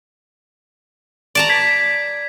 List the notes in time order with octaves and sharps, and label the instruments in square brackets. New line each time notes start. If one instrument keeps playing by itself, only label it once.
[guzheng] D5 A5 A#5
[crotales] G#6 B6